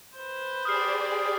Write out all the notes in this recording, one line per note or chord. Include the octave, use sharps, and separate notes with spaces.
B4 C5
G4 G#4 D5 D#6 F6 C7